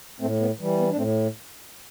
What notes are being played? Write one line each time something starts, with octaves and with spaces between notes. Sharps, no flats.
A2 A3 C4
B3
E3 G3
B3
D4
A2 A3 C4